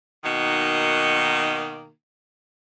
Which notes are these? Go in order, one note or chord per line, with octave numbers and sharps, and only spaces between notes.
B2 D#3 A#3 D#4 F#4